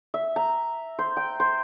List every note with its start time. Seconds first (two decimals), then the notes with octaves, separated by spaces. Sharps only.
0.14 E5
0.36 A#5
0.99 C5
1.17 G5
1.40 C5